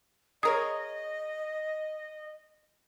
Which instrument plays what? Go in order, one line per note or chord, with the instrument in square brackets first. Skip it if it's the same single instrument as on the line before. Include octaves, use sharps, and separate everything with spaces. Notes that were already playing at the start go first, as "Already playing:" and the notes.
[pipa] G#4 A#4 C#5 [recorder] D#5 [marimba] D#6